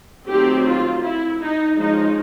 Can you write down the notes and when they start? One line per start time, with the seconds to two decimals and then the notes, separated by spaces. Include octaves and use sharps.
0.29 D#3 F#3 A3 C4 G4
0.67 F4
1.03 E4
1.40 D#4
1.76 F3 G#3 C#4 D#4